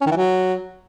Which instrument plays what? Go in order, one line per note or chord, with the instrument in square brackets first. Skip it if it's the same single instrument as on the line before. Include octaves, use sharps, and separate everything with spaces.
[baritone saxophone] C#4
D#3
E3
F#3